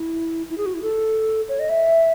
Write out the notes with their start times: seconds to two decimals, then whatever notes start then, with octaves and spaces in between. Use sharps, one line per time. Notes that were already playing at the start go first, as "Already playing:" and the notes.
Already playing: E4
0.49 E4
0.57 G#4
0.66 F#4
0.74 E4
0.82 A4
1.49 C#5
1.59 D#5
1.69 E5